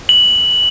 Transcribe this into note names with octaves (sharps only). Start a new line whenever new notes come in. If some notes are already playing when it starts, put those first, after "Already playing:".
F#7